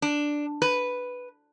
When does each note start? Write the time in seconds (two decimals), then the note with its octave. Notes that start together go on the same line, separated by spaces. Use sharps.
0.02 D4
0.62 B4